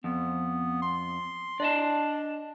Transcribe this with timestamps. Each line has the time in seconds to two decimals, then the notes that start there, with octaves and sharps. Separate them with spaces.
0.04 F2 B3
0.82 C6
1.60 D4 D5 D#5 A5